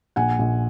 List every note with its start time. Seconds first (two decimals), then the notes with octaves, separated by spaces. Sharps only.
0.16 A#1 F#5 G#5
0.39 A#1